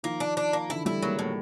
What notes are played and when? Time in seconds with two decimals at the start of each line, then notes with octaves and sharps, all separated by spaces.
0.03 D#3 F3 A#3
0.20 D4
0.37 D4
0.53 A#3
0.69 D3 E3 E4
0.85 G3 A3 E4
1.02 F#3 G#3 A#3
1.19 A2 G3 A3